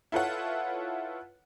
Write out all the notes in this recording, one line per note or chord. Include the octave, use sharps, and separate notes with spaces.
E4 F4 A4 B4 C#5 F#5